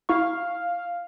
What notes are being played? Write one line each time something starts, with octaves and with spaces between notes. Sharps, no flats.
E4 F5 C#6